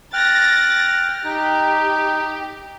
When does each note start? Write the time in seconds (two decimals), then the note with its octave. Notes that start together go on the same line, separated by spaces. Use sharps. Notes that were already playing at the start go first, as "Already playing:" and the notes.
0.13 G5 F6 F#6 A6 A#6
1.24 D#4 G4